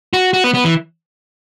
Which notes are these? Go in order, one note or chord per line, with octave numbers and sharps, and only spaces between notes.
F#4
F#4
B3
B3
E3